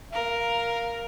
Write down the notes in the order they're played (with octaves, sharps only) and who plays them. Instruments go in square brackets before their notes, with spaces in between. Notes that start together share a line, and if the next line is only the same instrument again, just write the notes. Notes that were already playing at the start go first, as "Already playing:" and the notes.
[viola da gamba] A#4 [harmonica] F5